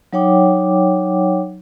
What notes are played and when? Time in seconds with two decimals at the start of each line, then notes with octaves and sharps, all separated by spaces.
0.13 F#3 D#4 C#5 F#5 G5 D6